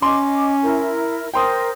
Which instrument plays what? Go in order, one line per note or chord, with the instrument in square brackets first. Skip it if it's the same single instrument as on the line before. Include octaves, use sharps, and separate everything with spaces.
[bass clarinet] C#4 [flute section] D#5 D6 [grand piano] C6
[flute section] E4 A#4
[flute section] A#4 C5 [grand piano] G5 C6 D#6